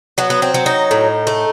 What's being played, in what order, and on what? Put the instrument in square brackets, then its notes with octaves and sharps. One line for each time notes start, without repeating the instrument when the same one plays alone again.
[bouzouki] F#3 B3
B3
C4
F#3
D#4
A2
A3